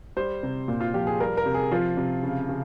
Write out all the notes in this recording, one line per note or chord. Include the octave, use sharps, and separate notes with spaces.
G3 C5
C3
A#2
F4
F3 G4
G#4
G3 A#4
A#4
C3
G#4
F3 F4
C3
C#3
C#3